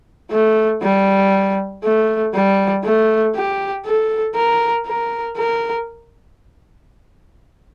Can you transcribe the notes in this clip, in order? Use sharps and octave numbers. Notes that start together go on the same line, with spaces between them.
A3
G3
A3
G3
A3
G4
A4
A#4
A#4
A#4